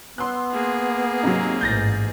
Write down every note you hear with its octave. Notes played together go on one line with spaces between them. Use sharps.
B3 C6 E6 F#6
A#3 G#4
G#2 C3 F#3
A1 G#2 G6 A6 A#6